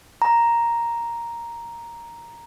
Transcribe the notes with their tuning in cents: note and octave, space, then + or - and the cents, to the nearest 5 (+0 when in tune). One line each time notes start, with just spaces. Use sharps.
A#5 +5